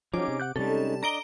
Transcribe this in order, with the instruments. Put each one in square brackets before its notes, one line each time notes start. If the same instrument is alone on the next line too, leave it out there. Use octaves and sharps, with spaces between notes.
[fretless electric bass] F3 F#3 [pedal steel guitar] C#4 D#4 G#4 [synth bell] D6
[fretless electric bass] C3
[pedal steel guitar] F#5 F#6 G6
[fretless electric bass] C3 G3 [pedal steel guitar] G#3 C#4 D#4 [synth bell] A4
[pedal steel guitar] D4 D5 D#5 [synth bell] A#5 D7 G7